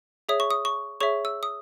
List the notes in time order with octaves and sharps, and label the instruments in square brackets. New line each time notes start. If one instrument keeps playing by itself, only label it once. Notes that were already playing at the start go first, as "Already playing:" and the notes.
[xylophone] G#4 C#5 E5 D#6
C#6
D#6
C#6
G#4 C#5 E5 C#6
E6
D#6